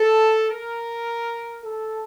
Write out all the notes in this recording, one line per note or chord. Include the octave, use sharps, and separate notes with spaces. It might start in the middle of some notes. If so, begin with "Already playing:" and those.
Already playing: A4
A#4
A4